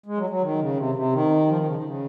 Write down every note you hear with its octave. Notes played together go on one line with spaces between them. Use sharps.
G#3
F#3
F#3
D#3
C#3
C3
C3
D#3
F3
D#3
C#3
D#3
C#3